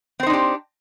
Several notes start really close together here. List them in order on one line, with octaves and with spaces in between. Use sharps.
C4 C5 D#4 D4 G4